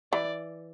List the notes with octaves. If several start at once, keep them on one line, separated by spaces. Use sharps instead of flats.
E3 D5